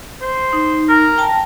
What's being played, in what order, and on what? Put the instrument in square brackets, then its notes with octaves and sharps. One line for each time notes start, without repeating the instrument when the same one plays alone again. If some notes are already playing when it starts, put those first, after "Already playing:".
[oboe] C5
[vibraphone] D#4
[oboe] A#4
[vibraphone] G5 A5